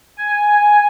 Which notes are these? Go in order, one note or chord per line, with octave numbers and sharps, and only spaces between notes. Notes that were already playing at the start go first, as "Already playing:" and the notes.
G#5